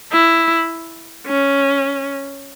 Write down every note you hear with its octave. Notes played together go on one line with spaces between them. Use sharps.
E4
C#4